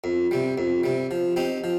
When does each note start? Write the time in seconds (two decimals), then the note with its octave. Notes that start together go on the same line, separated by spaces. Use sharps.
0.04 F2
0.31 C3 G3
0.58 F2
0.84 C3 G3
1.11 F3
1.36 C4 D#4 G4
1.64 F3